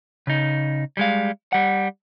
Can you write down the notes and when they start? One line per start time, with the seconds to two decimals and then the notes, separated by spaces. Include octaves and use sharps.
0.27 C#3 D#4
0.97 G3 G#3 F5
1.53 G3 F#5